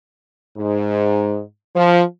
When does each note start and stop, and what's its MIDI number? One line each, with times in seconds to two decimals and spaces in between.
0.58 1.41 44
1.76 2.02 53